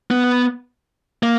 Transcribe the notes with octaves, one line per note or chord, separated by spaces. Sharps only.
B3
A#3